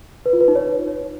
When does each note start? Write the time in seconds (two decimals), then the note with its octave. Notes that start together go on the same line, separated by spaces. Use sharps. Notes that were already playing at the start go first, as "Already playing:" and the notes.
0.26 B4
0.33 F4
0.41 B4
0.48 D#4
0.55 C#5